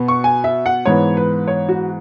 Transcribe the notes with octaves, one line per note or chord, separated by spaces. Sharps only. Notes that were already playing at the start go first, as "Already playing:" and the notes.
Already playing: B2 B3
C#6
G#5
E5
F#5
G#2 E3 B3 C#5
B4
C#5
F#4